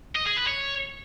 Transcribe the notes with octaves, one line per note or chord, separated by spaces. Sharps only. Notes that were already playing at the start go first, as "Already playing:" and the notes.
D#5
G#4
B4
C#5